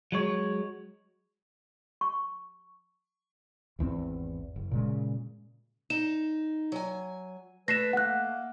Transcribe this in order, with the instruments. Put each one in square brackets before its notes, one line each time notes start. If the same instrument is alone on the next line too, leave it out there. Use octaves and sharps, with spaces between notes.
[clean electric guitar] F#3 G#3 C#5
[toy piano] C#6
[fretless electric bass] G#1 E2 C#3 C4
F#1
A#2 C#3 G#3
[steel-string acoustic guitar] D#4 [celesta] E7
[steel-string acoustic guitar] F#3 G#5
[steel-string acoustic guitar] A3 [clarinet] B4 [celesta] A#6 C7 E7
[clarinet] A#3 [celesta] F#5 F#6